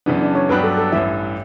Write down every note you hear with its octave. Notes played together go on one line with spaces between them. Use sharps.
F#2 C#3 E3 B3 D4
D4
C#5
G2 F#3 B3 D4 G4 B4
A4
A4
A1 G2 E3 E5